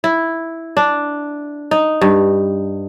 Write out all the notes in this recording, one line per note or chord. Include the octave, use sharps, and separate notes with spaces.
E4
D4
D#4
G2